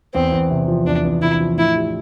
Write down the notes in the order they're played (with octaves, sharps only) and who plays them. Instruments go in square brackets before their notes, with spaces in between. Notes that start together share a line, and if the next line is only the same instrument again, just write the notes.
[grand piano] E2 [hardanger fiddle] C4
[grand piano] E2
C3
F3
[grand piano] E2 [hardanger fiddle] D4
[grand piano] E2
[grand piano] C3 [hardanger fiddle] E4
[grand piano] F3
[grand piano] A2 [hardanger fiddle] E4
[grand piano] G4